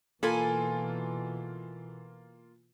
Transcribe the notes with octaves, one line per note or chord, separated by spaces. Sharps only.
B2 E3 A#3 F4 A4 G#5 B5